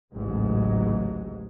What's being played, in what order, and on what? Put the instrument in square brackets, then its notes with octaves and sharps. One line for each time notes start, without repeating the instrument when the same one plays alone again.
[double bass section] A1 D2 G#2 C#3 F#3 G#3